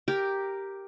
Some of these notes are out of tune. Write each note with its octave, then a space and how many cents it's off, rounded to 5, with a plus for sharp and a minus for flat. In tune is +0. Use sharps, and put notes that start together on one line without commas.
G4 +0 A#4 +0